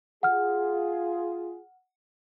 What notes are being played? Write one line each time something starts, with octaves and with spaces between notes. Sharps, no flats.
F4 G#4 F#5 F6